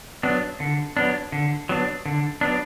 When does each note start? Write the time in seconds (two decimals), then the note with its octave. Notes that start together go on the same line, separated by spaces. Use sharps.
0.23 F#3 B3 D4
0.60 D3
0.97 F#3 B3 D4
1.32 D3
1.69 F#3 B3 D4
2.06 D3
2.41 F#3 B3 D4